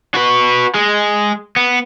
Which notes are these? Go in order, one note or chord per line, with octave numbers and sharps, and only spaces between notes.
F#4 B4
G#3
B3